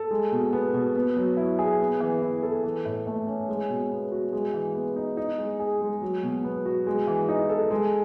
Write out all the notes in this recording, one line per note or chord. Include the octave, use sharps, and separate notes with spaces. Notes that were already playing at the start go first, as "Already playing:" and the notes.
Already playing: A4
G#3
B2
B3
B2
B3
F#3
E4
G#4
B3
E3
E4
A4
E3
A2
A3
C#4
G#3
B2
B3
F#4
G#3
E3
B3
D#4
D#4
G#3
G#4
G#3
F#3
B2
B3
F#4
G#3
E3
D#4
A4
G#3